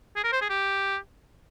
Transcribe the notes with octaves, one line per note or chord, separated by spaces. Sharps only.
G#4
A#4
C5
G#4
G4